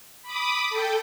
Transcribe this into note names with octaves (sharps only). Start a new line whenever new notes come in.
B5 D6 D#6
A4 G5